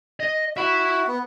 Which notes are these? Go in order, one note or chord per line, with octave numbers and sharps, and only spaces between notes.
D#5
F#4 E5 B5
B3